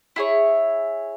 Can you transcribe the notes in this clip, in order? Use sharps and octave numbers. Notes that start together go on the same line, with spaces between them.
E4 G#4 C#5